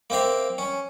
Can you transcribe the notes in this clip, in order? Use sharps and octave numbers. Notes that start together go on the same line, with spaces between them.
A#3 C4 E5 F5
C#4